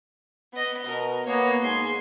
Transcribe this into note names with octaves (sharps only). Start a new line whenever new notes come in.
B3 D#5
B2 A#4
A#3 B3 C#5
G#2 G#5 C6